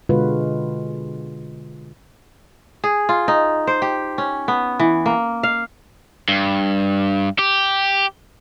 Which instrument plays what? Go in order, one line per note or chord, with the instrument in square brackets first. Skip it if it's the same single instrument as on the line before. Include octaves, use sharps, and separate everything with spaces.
[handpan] B2 D3 G#3 F4 F#4 B4
[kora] G#4
F4
D#4
C5
G4
C#4
B3
E3
A#3
F5
[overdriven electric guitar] G2
G4